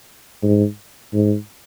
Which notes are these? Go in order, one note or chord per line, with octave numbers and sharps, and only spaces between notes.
G#2
G#2